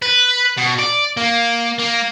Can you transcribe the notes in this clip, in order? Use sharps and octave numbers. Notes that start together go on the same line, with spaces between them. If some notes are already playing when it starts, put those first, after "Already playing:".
B4
B2
D5
A#3
A#3